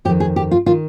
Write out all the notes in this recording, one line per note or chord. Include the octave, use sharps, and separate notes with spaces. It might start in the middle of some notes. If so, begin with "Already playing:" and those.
F2 D#3 G4
G#4
G4
F4
D#3 F4